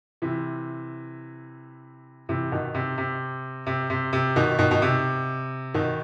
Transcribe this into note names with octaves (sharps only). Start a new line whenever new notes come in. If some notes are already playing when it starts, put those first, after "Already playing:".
C3 E3
C3 E3
B2 D#3
C3
C3
C3
C3
C3
B2 D#3
B2 D#3
B2
C3
B2 D#3